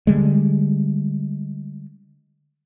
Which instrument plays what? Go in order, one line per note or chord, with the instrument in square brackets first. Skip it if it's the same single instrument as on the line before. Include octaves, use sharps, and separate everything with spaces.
[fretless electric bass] D3 G3 G#3